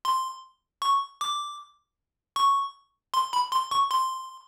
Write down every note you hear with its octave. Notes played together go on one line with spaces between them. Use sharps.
C6
C#6
D6
C#6
C6
B5
C6
C#6
C6